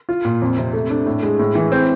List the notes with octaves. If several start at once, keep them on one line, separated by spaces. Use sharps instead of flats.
F4
A#2
F2
C3
A3
D4
A2
G#3
A2
E3
C4